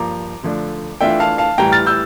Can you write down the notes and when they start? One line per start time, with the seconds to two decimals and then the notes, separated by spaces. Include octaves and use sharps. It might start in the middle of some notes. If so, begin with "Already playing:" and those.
Already playing: G2 F3 A#3 A#5 D6
0.43 D3 F3 A3 D4
1.01 E3 A3 D4 F4 E5 G5
1.20 F5 A5
1.38 F5 A5
1.58 A2 E3 G3 G5 A#5
1.72 F6 A6
1.86 E6 G6